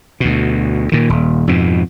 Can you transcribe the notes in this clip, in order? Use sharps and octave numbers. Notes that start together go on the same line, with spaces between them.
D2 B2
A#2 D#3
D#1
F2 G#2 B2